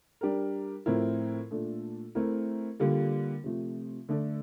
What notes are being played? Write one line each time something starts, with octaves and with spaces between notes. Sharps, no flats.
G3 D4 G4 A#4
A2 F3 C4 E4 A#4
A#2 A3 D4 A4
A3 C4 E4 A#4
D3 G3 A#3 F4
C3 F3 A3
D3 A3 D4 A4